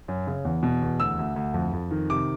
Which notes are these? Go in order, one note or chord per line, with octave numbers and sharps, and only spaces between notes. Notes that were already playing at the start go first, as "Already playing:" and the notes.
F#2
C#3
E2
B2
E2
D2 E6
D2
D2
F2
F2
D#3
C3 D6